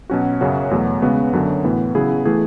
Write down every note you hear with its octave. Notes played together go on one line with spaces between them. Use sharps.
B2 F#3 C#4 F#4
F#2 C#3 F#3 C#4 F#4
E2 B2 F#3 A3
C#3 G#3 B3 F#4
F#2 D3 F#3
A2 E3 B3
C#3 F#3 B3 E4 G#4
E3 A3 E4 G#4